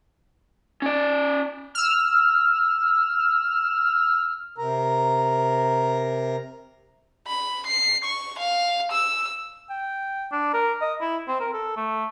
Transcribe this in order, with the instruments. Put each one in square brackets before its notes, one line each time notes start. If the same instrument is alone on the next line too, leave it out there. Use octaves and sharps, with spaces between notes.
[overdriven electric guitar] C#4 D5
[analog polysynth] E6 F6
[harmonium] C3 A#4 A#5
[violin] B5
C7
C#6
F5
E6
[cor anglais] G5
D4
A#4
D#5
E4
C4
A#4
A4
A3